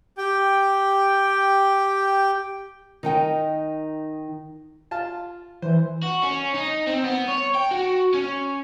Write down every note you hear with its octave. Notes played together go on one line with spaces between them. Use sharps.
G4 G5
D#3 D#4 G5
F4 A5
E3 C5
F#4
C#4
D#4
C4
B3
C#5
G5
F#4
C#4